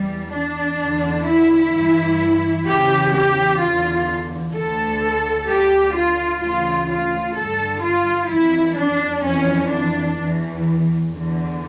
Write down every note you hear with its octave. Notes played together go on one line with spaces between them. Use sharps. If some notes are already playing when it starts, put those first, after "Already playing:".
Already playing: E2 E3 G3
D4
E2 D3
E4
G2 E3
E2 C#3 E3 G4
G4
E2 D3 F4
D2 D3 A4
D2 D3 G4
F4
D2 C#3 E3 F4
F4
G2 D3 A4
F4
F2 E3 E4
D4
F2 E3 C#4
D4
E2 E3
E2 D3